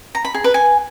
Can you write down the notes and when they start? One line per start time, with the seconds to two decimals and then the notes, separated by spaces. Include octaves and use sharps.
0.15 A#5
0.25 B5
0.34 G#4
0.44 B4
0.54 G#5